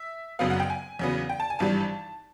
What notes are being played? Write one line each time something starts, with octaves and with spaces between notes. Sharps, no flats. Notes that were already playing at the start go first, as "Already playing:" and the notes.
Already playing: E5
F#1 F#2 C#3 F#3 B3 F5
F#5
G5
G#5
E2 C#3 F#3 B3
G5
A5
G#5
G#1 G2 E3 G3 A5